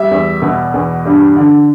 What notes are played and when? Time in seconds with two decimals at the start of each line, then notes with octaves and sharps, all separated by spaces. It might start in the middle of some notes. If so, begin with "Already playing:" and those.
Already playing: G3 E5
0.11 E2
0.42 B2
0.74 E2
1.05 G2
1.36 D3